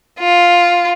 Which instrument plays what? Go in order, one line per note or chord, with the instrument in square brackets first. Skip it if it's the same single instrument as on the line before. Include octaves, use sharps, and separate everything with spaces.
[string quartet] F4